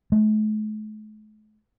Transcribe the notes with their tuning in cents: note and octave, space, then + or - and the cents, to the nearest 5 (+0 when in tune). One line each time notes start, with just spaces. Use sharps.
A3 -45